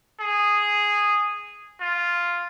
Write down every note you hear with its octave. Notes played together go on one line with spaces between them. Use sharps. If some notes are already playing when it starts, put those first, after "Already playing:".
G#4
F4